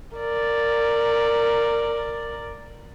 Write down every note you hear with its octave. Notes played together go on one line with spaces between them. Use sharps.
A#4 D5